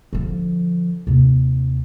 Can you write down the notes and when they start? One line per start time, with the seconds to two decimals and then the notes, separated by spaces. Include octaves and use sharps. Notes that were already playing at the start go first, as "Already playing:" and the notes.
0.13 D3 F3
1.07 D#2 C3